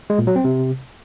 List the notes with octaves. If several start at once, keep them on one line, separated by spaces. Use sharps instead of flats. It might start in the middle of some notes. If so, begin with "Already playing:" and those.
G#3
A#2
F#3
C4
C3